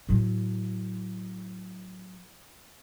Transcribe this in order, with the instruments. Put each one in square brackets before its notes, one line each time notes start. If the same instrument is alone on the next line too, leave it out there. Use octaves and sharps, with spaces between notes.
[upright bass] A2 F#3